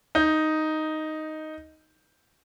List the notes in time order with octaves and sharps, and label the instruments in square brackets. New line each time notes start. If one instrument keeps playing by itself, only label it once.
[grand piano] D#4 G6